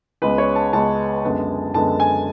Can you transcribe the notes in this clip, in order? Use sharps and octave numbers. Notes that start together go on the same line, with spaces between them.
C#2 C#3 G#3 B3 B4
C#5
A5
C#2 C#3 G#3 B3 A5
F#2 D3 G#3 B3
F#2 D3 G#3 B3 A5
G#5